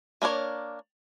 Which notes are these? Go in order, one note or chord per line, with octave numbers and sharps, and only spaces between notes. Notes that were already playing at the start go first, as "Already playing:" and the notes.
A#3 D4 A#4 C#5